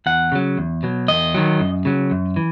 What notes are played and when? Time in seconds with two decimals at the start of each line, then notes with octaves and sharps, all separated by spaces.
0.06 E2 F#5
0.32 C#3 F#3
0.58 E2
0.83 B2 F#3
1.08 E2 D#5
1.34 D#3 F#3
1.60 F#2
1.85 C#3 F#3
2.11 F#2
2.36 E3